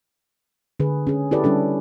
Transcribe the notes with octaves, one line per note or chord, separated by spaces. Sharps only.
D3 G#4 B4
C#4 G#4
E4 G4 A4 B4 D5
G3 C#4 D4 A4